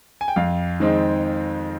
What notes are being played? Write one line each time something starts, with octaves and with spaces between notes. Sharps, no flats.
G#5
G5
F2 F5
D#3 G#3 C4 D#4